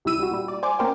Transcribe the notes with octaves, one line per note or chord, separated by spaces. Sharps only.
D2 C3 G3 E4 E6 D#7
G3 F#4
A#2 G3
D5
C5 D5 G#5 D6
A#3 C#4 A#4 C5 G5